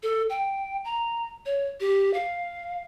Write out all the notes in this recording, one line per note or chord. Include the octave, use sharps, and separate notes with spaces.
A4
G5
A#5
C#5
G4
F5